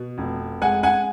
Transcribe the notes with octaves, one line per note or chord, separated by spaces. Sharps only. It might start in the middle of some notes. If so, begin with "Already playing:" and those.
Already playing: B2
F1
G#3 F#5 G#5
F#5 G#5